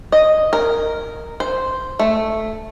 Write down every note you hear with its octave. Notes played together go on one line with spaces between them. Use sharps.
D#5
A#4
C5
A3